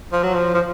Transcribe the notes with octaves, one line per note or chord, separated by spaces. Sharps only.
F3
F#3
F3
F3